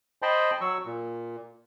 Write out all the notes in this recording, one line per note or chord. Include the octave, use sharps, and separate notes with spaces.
C5 D#5 G5 A5 B5 C6
F#3 C#6 E6
A#2